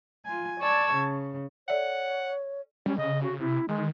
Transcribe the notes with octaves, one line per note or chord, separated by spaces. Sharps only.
F4 G#5
D5 A5 C#6 E6 G#6
C#3
A4 C#5 D5 E5 F#5
G3 C#4
C#3 D#5
F#4
C3 E4
D#3 G#3